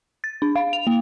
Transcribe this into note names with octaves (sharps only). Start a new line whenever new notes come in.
A6
D4
F5
F7
A#3